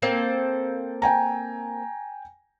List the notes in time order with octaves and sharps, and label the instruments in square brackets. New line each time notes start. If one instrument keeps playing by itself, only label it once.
[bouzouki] A#3 C4 A4
[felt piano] G5 G#5 A#5